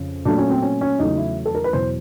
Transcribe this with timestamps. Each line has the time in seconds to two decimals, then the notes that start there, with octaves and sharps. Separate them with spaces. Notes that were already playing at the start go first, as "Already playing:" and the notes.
Already playing: F2 C#3
0.25 A#2 F#3 A3 D4
0.38 C#4
0.50 C4
0.62 C#4
0.81 C#4
0.99 E2 C#3 F#3 A3 D#4
1.17 E4
1.46 A4
1.55 A#4
1.64 B4
1.73 E2 B2 F#3 C5